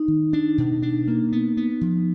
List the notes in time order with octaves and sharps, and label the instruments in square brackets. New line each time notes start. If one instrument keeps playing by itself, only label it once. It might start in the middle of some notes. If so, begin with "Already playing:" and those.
Already playing: [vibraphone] D#4
[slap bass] D#3
D4
B2
D4
A#3
B3
B3
F3